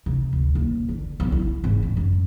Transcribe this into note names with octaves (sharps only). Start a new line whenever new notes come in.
C3
D2
D#1
D3
B1
E4
G#1
D#3
F#2